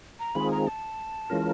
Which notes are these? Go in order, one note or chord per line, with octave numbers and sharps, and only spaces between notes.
A#5
D#3 G#3 C4 F4 G#4 B5
A#5
A5
E3 G#3 C#4 F4 A#4